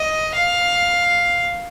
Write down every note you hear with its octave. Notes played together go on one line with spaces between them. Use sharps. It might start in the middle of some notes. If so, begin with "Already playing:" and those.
Already playing: D#5
F5